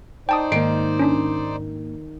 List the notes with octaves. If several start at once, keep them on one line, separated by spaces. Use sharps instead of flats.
D#4 C5 D5 G5 A5 D#6
G#2 D#3 A#3 C7 D7
C#4 D4